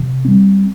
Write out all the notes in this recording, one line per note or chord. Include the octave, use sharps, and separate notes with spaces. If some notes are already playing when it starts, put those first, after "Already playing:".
Already playing: C3
G3 C4